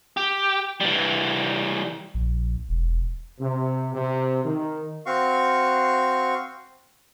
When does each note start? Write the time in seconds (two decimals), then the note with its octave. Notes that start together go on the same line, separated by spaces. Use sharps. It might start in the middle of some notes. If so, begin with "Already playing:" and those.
0.17 G4
0.81 E3 G3
2.14 A#1
2.69 E1
3.40 C3
3.94 C3
4.44 D#3
5.06 C4 F#4 F5 C#6